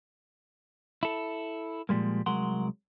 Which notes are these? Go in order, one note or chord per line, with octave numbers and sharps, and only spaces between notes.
E4 A4
A#2 F3 G3 G#3 A#3
C2 F#3 G#3 A#4 F#5 C6